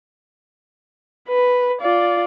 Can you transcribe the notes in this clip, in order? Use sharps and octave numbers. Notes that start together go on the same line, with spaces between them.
B4
F4 D5